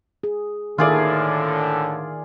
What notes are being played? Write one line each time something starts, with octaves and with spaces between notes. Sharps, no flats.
G#4
A2 D3 D#3 F4 G#4 A#4 D5 E5